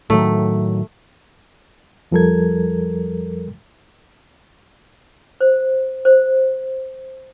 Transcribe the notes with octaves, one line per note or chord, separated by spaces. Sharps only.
A2 D#3 F#3 A3
F2 F3 G3 A4 A#4 G#6
C5
C5